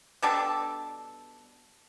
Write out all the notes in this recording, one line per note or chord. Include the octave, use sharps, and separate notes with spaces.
B2 G3 D4 A4